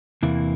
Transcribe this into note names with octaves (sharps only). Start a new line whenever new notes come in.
E2 C3 E3 A#3 E4